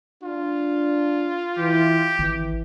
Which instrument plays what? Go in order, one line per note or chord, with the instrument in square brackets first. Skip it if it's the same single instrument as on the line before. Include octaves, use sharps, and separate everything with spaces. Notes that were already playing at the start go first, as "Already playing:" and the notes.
[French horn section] D4 [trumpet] F4
[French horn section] E3 [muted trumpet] G4
[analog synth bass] G#1 [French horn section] E3